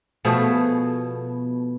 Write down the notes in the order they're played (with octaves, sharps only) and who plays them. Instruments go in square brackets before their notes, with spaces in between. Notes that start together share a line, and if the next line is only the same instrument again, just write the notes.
[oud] B2 A4 [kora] F3 A3 G#4